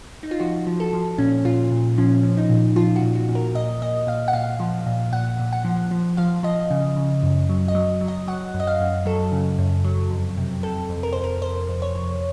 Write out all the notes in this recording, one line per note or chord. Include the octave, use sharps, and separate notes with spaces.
D#4
F4
F3 F#4
F3
A4
F3
A#2 C#4
A#2 F4
A#2
F3 C#4
F3
D#4
A#2
F3 F4
F#4
A#2
F#4
A#2
A#4
A#2 D#5
A#2 D#5
A#2 F5
F#5
A#2 F5
F3
A#2
A#2 F#5
A#2
F#5
F3
F3
F3 F5
F3 D#5
C#3
C#3
F#2
F#3
D#5
F#3
F#3
D#5
F#3 F#5
F#2
D#5
F5
F#2
F#3 A4
C#3
F#2
F#3
F2
C3
C3 A4
F2
A#4
F2 C5
A#4
F2 C5
F2
C#5
F2